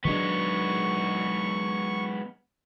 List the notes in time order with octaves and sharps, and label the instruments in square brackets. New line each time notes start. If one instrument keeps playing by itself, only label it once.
[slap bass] D#3 F#3 D4 [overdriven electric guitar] G#3 B3 [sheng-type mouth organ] C#6